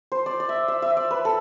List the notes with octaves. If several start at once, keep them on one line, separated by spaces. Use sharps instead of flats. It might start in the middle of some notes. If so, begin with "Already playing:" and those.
C5
D5
D5
E5
E5
E5
D5
B4
A4